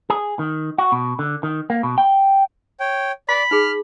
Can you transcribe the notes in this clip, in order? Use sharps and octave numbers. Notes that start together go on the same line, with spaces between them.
G#4
D#3
F#4
B2
D3
D#3
A#3
B2
G5
C#5 G5
D5 B5
D#4 G#4 F6